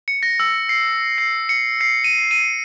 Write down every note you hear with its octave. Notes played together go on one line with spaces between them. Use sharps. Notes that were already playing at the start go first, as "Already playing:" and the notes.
C#7
A#6
E6
C7
C7
C#7
C7
D#7
D#7